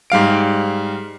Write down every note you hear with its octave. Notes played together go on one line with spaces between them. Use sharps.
G#2 G3 F5 D7